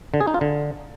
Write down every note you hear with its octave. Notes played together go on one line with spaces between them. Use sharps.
D3
G#4
D#4
F4
D3